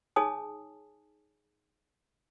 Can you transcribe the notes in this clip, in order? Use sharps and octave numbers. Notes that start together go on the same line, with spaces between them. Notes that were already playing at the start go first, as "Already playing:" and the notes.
D#4 G#4 C#5 G#5 A5 D#6